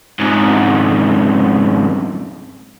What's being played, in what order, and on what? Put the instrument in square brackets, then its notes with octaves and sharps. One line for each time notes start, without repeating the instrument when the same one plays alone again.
[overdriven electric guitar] F2 G#2